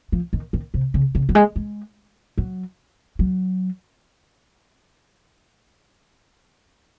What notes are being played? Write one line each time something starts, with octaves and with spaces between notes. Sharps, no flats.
F3
D#3
D#3
C3
C#3
C#3
F#3
G#3
G#3
F#3
F#3